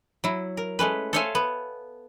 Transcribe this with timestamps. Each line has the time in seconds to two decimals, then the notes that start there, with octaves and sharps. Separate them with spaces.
0.24 F#3 E4
0.57 A#4
0.79 G#3 A3 C#4 B4
1.13 A4 C5 C#5 E5 F5 G#5
1.35 B3